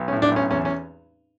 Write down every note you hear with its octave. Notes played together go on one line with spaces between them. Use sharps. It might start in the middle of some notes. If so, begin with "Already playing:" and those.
Already playing: B1
C#4
A2
D4
B1 C#4
E2 C#4
C#4